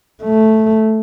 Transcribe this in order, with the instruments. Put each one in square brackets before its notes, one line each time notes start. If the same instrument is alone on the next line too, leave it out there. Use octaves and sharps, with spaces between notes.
[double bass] A3